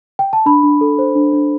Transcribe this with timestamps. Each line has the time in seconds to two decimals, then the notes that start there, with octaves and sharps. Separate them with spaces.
0.19 G5
0.33 A5
0.46 D4 B5
0.63 D4
0.81 A4
0.99 C5
1.15 D4
1.33 D4